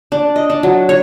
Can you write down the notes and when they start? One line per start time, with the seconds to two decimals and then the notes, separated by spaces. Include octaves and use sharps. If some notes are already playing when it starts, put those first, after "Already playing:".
0.12 D4
0.36 D#5
0.50 D4
0.63 F#3
0.89 C#5